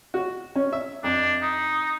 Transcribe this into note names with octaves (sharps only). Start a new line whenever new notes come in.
F#4
C#4
E5
F2 D4
D#4